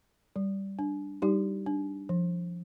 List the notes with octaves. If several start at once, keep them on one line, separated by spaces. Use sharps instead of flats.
G3
D4
G3 D#4 G4
D4
F3